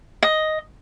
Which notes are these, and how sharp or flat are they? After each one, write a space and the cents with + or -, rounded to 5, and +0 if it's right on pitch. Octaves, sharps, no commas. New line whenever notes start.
D#5 +5